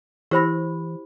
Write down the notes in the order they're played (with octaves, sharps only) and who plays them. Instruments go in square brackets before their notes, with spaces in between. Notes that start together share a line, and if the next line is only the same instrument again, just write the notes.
[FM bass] E3 [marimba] E4 E6 A#6 [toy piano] G4 C5 B5